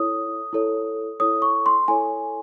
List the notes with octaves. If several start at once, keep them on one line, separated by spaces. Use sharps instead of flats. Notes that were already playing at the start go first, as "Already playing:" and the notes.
Already playing: E4 A4 C#5 D#6
E4 A4 C#5
E4 A4 C#5 D#6
C#6
C6
E4 A4 C#5 G#5